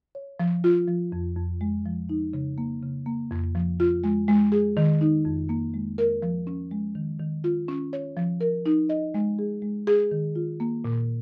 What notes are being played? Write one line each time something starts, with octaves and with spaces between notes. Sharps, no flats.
C#5
F3
F4
F3
F2
F2
G#3
F3
D#4
C#3
A#3
C#3
A#3
F2
F3
F4
G#3
G#3
G#4
D#3
D#4
F2
A#3
G#3
A#4
F3
C#4
G#3
D#3
D#3
F4
C#4
C#5
F3
A#4
D#4
D#5
G#3
G#4
G#3
G#4
D#3
F4
A#3
A#2